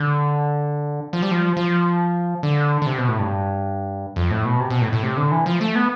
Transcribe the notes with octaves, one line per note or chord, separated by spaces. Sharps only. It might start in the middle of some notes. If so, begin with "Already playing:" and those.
Already playing: D3
F3
G3
F3
F3
D3
D3
C3
B2
A2
G2
F2
A2
B2
C3
B2
A2
A2
C3
D3
E3
F3
A3
B3